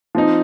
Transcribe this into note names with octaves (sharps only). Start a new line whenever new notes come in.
F3 C4 D#4